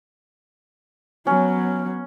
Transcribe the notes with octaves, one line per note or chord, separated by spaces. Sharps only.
F#3 B3 C#4